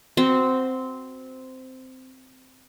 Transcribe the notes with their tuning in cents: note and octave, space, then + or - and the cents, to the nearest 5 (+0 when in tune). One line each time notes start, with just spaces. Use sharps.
C4 -10 F#4 +0